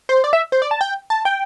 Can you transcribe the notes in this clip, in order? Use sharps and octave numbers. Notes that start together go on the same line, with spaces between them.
C5
D5
E5
C5
D5
A5
G5
A5
G5